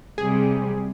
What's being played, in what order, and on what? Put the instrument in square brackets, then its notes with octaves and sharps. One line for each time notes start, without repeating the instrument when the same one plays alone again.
[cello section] C3 G3 [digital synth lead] G#4